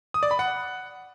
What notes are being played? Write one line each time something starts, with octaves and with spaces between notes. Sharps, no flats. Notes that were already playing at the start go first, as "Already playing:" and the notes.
D#6
D5
B5
F#5